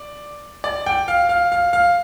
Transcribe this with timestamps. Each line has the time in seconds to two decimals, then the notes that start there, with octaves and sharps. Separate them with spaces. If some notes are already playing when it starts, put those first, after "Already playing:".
Already playing: D5
0.64 D5
0.86 G5
1.08 F5
1.29 F5
1.52 F5
1.73 F5